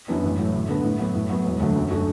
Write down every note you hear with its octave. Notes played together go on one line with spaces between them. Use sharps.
F#2 E3 B3 D4
A1
A2 F#3
D2
D3 B3
A2
F#3 B3
A2
F#3 B3
E1
D2 D3 F#3 A3
F#2
F#3 A3 D4 F#4